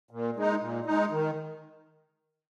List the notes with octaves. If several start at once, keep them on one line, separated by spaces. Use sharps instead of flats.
A#2
G#3 D#4
A#2
G#3 D#4
D#3